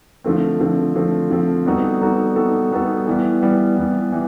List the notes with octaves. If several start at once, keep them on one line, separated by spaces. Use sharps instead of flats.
D3 F3 A3 C4
D3 F3 A3 C4
D3 F3 A3 C4
D3 F3 A3 C4
G3 B3 D#4 F#4 A4
G3 B3 D#4 F#4 A4
G3 B3 D#4 F#4 A4
G3 B3 D#4 F#4 A4
E3 G3 B3
E3 G3 B3
E3 G3 B3
E3 G3